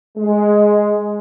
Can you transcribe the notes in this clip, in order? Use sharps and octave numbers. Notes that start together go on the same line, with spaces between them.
G#3